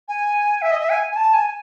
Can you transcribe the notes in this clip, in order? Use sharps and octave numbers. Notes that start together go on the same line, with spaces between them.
G#5
E5
D#5
E5
G#5
G#5
A5
G#5